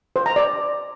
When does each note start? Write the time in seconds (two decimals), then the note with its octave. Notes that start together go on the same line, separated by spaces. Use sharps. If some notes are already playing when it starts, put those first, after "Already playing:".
0.16 C5
0.26 A#5
0.36 D5